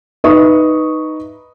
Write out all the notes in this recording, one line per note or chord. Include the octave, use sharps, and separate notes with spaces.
D#4 B4 D#5 E5 C#6 D#6